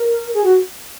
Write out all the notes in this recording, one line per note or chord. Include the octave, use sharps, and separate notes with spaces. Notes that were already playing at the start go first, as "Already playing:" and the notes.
Already playing: A#4
G#4
F#4